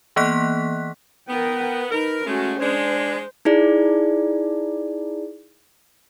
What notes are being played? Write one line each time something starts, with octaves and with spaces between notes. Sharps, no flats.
E3 A#3 B3 F#6 B6
B3 A#4 G5
D#4 A#4 B4
G#3 A3 C#4 F#4
G#3 D4 C5
D#4 E4 G#4 D5